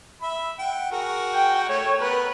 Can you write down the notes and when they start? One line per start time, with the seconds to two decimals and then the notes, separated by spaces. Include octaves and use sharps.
0.22 E5 B5
0.59 F#5 G5
0.92 F#4 G#4 A#4
1.34 G5
1.69 A3 C#5
2.01 B3 A#4 B4